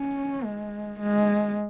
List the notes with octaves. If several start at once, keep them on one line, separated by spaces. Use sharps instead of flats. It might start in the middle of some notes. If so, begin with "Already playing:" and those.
Already playing: C#4
G#3
G#3